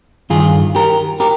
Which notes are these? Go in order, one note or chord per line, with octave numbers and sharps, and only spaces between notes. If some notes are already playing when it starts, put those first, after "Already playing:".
G2 D#3 F4 G#4
G4 A#4
G4 A#4